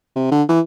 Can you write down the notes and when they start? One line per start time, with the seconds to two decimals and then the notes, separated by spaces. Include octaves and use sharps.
0.16 C3
0.32 D3
0.49 E3